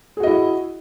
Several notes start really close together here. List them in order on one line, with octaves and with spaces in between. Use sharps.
G#4 F#4 D#5 E4